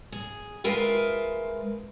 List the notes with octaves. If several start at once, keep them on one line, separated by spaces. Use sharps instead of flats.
G#4
G#3 F4 A#4 B4 E5